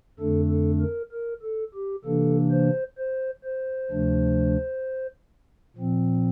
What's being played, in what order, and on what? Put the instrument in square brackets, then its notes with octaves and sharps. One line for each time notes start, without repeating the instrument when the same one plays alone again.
[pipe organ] F2 D3 A3 D4 A4
A4
A#4
A#4
A4
G4
C3 E3 A#3 D4 A4
C5
C5
C5
D2 C3 F3 A3 D4
A#2 F3 C4